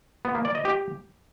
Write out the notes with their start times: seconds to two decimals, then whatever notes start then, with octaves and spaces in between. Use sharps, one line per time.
0.25 B3
0.35 A#3
0.45 D5
0.55 D#5
0.65 G4